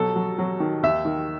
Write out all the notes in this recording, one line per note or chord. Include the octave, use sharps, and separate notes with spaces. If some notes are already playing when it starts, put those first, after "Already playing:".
Already playing: B2 F#3 A4
F#3
F#3
D#3
D#2 E5
D#3